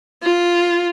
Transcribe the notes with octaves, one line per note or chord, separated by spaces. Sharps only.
F4